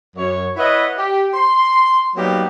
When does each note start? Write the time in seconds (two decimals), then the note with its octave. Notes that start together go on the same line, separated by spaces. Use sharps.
0.17 F#2 C#5
0.57 E4 B4 C#5 D#5 E5 F#5
0.98 G4
1.34 C6
2.16 F#3 G3 A#3 B3 D#4 G4